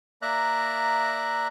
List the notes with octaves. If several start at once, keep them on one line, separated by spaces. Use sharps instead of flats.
A#3 D5 E5 A#5 F#6